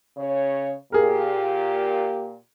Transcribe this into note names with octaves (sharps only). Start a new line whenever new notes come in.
C#3 C#5
A#2 G4 G#4 A#4